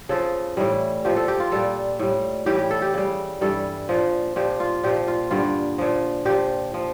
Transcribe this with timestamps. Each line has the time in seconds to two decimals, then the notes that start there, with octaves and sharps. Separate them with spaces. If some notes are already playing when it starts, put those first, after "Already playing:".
0.09 C#3 F3 A4
0.57 A2 E3 G3
1.05 A#2 F3 G4
1.16 A4
1.28 G4
1.40 F4
1.52 A#2 G3 A4
1.99 A2 G3
2.46 A2 E3 G3 G4
2.59 G4
2.70 A4
2.82 G4
2.94 C#3 G3
3.41 G2 E3 G3 A4
3.89 A#2 F3
4.36 A#2 F3 G4
4.60 F4
4.83 A#2 F3 G4
5.08 F4
5.31 G2 D3 G3 F4
5.78 A#2 F3
6.25 A#2 F3 G4
6.74 F3